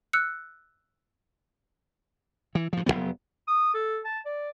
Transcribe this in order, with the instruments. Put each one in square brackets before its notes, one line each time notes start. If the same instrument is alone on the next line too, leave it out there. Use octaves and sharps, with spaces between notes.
[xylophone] E6 F#6 C#7
[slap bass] E3
G2 F3
F1 G2 F#3 B3
[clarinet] D#6
A4
A5
D5